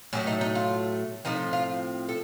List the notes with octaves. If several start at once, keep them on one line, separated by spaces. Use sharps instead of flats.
A2 F#3 A3 C#4
D#4
D#4
F4
A2 F3 C4 D#4
F4
A4